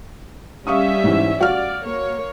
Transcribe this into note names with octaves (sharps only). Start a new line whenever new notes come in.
G3 C#4 E5 F5 C#6 D#6
G#2 E3
F#4 D5 F5 F6
A#3 C#5